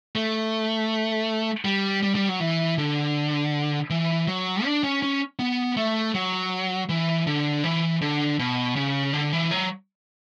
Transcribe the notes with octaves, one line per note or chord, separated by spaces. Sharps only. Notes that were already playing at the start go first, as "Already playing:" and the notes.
A3
G3
G3
G3
F#3
E3
D3
E3
F#3
D4
C#4
C#4
B3
A3
F#3
E3
D3
E3
D3
B2
C#3
D3
E3
F#3